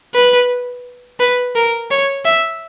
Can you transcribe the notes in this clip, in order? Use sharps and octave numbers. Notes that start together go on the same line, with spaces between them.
B4
B4
A#4
C#5
E5